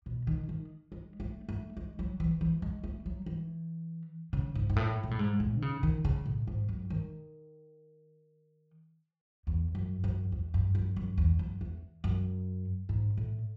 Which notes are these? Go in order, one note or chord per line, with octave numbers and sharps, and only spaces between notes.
B2
D#3
D#3
G#3
A3
A3
G#3
F#3
E3
E3
G#3
A3
F#3
E3
C#3
G#2
G#2
A2
B2
A2
G#2
A2
D#3
C#3
D#3
C#3
A2
G#2
F#2
D#3
E2
F#2
F#2
E2
F#2
F#2
F#2
E2
F#2
E2
F#2
G#2
A2